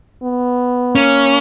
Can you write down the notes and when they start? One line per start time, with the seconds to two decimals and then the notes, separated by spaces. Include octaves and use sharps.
0.22 B3
0.95 A#3 C#4